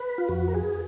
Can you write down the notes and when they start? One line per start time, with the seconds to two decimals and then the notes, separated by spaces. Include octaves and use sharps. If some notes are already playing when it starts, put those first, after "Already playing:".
Already playing: B4
0.18 F4
0.28 F2 F#4
0.48 A#4
0.54 G#4